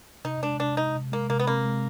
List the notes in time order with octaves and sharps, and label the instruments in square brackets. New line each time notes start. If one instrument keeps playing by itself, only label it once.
[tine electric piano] C3 [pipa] D#4
[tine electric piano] G#3 [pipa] D4
[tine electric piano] C3 [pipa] D4
[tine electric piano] C3 [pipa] D#4
[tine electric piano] C3
[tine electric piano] G#3 [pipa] A#3
[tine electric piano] C3 [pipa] A#3
[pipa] B3
[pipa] A#3 [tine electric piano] C4
[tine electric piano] G#3